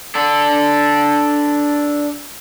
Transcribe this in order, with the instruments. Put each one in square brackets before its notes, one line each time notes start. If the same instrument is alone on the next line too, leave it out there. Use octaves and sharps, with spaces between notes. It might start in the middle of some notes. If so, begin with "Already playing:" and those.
[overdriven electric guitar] D4 A4